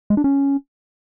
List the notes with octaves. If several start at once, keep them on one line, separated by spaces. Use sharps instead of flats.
G#3
D4
C#4